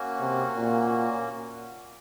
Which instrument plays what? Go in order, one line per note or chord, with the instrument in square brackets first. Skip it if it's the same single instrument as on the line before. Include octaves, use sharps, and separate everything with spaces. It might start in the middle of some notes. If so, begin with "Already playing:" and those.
Already playing: [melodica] A#3 C#4 F#4
[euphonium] C3
A#2